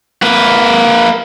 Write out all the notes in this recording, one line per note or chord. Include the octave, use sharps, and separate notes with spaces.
A#3 B4